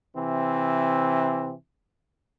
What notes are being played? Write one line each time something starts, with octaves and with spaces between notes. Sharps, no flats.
C3 E3 C4